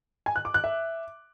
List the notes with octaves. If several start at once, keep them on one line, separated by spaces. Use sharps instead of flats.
G#5
F#6
D6
F#6
E5